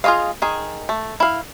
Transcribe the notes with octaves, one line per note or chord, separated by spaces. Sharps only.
F4 G#4 C#5 D#5 F5
D#3 G#4
A3
E4 F5